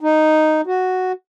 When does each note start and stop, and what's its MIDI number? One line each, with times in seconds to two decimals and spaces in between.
0.01 0.61 63
0.66 1.12 66